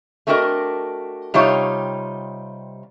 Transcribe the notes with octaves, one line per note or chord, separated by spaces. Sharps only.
A3 C4 D4 F#4 A#4 D#5
C3 G3 D#4 F4 C#5